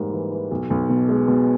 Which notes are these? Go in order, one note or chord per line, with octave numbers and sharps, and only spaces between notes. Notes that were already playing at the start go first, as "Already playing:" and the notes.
Already playing: G#2 E3 G3 A#3
E3
E3
B1
B1
B2
G#3
B2